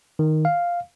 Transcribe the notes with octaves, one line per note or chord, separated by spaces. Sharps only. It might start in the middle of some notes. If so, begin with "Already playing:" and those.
D#3
F5